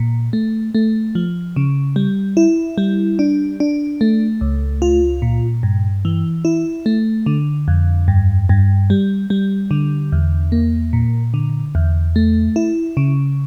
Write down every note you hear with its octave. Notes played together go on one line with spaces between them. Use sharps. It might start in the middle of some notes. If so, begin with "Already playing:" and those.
Already playing: A#2
A3
A3
F3
C#3
G3
E4
G3
D4
D4
A3
C#2
F4
A#2
G2
E3
E4
A3
D3
F2
G2
G2
G3
G3
D3
E2
A#3
A#2
D3
E2
A3
E4
C#3